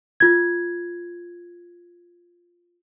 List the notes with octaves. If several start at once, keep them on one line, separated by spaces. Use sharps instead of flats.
F4 G#6